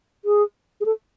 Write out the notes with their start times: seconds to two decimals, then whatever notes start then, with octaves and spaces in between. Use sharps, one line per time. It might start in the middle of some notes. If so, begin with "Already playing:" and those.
0.25 G#4
0.80 G#4
0.85 A4